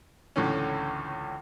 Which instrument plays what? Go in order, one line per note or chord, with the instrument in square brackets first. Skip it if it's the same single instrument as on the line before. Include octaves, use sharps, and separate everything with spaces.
[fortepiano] C#2 A2 D3 E3 C#4